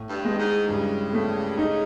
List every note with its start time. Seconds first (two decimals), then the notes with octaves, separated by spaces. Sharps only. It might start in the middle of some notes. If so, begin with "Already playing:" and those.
Already playing: A2
0.10 G2
0.25 G#3
0.39 G#2
0.68 G2 C#3
1.13 A3
1.57 C#3 D#4